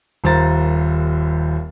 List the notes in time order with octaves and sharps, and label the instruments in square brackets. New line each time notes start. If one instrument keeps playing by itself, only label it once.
[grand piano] D#1 D#2 C5 A#5 A6